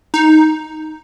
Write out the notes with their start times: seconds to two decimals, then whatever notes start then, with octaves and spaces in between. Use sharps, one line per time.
0.14 D#4